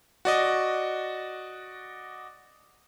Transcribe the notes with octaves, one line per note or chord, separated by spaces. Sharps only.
F#4 D5 D#5